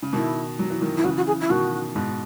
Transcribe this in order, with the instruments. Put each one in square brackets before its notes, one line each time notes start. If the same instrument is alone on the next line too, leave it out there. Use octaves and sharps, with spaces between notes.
[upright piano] C#3
[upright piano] B2 D#3 [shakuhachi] E4
[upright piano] F#3
E3
D#3 F#3
[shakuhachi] E4
[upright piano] C#3 E3 [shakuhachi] F#4
[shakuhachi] F#4
G#4
E4
[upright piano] B2 D#3 [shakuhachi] F#4
[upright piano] G#2 B2